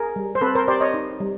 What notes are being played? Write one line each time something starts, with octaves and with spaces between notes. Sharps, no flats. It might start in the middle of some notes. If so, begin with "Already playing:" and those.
Already playing: G#4 A#4
G3
C5
C4 A4 B4
A#4 C5
G4 C5 D5
C#5 D#5
D#4
G3